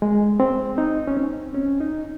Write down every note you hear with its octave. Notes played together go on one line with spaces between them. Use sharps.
G#3
C4
D#4
C#4
C4
C#4
D#4